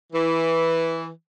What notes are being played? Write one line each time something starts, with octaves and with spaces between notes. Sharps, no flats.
E3